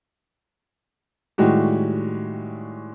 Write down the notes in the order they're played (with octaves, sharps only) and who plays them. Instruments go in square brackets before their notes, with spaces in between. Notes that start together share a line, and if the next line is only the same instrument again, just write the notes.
[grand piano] A2 D#3 G3 G#3 F#4 G4